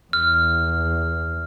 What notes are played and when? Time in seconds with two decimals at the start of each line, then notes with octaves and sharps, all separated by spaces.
0.13 E2 F6